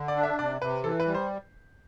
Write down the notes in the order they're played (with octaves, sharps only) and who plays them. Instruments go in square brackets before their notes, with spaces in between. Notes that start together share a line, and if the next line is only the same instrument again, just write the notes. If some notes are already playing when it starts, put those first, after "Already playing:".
Already playing: [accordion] D3
[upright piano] D5
[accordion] D4
[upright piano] E5
[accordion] C3 [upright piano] D5
[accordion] C3 [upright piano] B4
[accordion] E3 [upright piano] A4
[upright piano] B4
[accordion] G3
[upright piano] C5